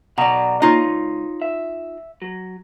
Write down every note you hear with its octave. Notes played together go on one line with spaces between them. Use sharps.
B1 B2 D5 F#5 A#5
A#2 D#4 F4 C#5
C#2
E5
F#3